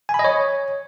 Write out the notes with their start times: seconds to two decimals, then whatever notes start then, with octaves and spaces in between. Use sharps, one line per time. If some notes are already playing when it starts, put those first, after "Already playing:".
0.09 G#5
0.14 B5
0.19 D#5
0.24 C#5